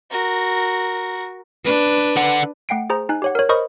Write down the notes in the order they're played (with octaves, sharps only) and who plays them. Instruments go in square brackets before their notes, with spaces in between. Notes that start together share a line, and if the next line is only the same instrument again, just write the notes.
[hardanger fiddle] F#4 A#4
[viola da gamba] D4 B4
[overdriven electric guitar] D3 F#5
[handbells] A3 F#5 G5 C7 D7
G#4 C5 A#5
D#4 G#5 F#6
G4 C#5 F#5
A#4 C#5
A#4 C5 D#5 B5 C#6 D#6